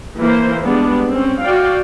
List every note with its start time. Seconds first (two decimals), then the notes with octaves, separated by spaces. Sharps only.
0.20 E3 A#3 C5
0.64 G3 G#3 B3 D4
1.09 C4 C#4
1.43 F#4 D5 F5 G5